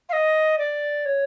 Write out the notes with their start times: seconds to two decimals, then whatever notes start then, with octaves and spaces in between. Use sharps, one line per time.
0.09 F5
0.13 D#5
0.58 D5
1.05 C#5